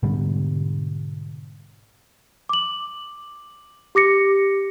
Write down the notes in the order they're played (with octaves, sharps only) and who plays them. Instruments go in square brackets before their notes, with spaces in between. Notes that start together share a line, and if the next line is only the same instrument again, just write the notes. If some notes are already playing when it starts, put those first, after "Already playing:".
[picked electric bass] G#2 B2 D3 G3
[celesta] D6 F#7
G4 D6 A#6 C#7